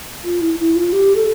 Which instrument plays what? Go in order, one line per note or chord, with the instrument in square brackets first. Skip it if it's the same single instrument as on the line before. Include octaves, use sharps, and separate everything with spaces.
[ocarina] F4
E4
E4
F4
G4
A4